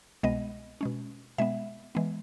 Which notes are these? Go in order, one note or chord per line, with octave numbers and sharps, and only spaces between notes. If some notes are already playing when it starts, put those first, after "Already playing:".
C2 B2 G#3 B3 D#5
B2 G#3 C#4
B2 G#3 B3 E5
E3 G#3 B3